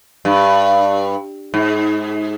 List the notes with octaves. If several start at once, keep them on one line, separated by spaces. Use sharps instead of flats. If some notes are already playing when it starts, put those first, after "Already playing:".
G2
G#2